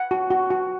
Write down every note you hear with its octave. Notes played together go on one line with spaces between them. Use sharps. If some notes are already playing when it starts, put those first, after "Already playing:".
Already playing: F#5
F#4
F#4
F#4